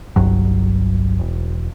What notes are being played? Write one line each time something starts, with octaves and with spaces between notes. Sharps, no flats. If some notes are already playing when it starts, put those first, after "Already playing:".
G1 C2 G2 F#3
E1